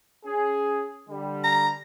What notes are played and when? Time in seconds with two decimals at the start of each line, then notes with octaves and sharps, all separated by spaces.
0.25 C#4 G#4
1.07 D3 G3
1.44 A#5